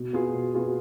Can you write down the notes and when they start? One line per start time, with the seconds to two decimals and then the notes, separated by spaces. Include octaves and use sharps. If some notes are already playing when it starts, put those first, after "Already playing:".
Already playing: B2
0.13 B3 F4 G#4
0.35 B2
0.54 B3 F4 G#4